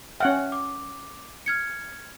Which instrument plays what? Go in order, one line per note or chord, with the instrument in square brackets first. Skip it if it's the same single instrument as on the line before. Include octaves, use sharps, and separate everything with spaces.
[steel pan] C#4 F#5 G5 [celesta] E5 F6
[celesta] D6
F6 G#6 C#7